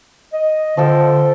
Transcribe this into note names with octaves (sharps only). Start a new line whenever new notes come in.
D#5
D3 F3 A4 G5